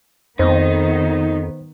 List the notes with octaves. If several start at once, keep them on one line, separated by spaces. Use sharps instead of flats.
F2 D#3 B3 D#4 C5